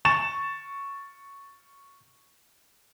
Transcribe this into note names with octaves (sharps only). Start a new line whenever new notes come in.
C#6 A6 E7